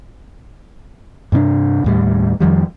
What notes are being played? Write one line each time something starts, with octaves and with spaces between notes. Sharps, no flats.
G2 C3 C#4 D4
D#2 A2 G3
F2 D#3 F3 G3